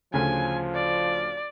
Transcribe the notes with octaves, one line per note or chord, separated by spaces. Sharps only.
D2 C#3 F3 G#5
D5